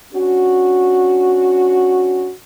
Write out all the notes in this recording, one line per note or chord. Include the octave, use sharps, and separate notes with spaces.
C#4 D4 F#4